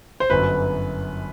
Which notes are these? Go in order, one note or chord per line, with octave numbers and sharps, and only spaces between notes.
C5
G1 F#2 F#3 B4